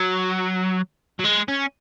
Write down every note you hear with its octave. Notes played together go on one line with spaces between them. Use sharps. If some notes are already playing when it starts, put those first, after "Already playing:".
Already playing: F#3
F#3
G#3
C#4